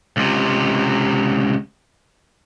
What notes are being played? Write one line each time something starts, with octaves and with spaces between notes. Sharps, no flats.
C#2 C3